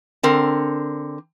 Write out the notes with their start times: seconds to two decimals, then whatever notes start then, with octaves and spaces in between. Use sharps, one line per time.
0.23 D3 C4 A#4